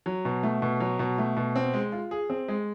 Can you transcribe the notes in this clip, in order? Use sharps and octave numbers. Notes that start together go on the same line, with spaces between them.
F#3
B2
A3
B2
F#3
B2
A3
B2
C4
G#3
F4
G#4
C4
G#3